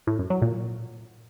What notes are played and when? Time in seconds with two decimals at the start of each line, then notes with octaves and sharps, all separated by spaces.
0.07 A2
0.19 F#2
0.30 F#3
0.42 A#2